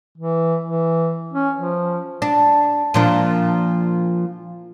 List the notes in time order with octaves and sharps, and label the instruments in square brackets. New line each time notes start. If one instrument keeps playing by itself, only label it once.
[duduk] E3
E3
C#4
F3
[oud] D4
A#2 F3 D4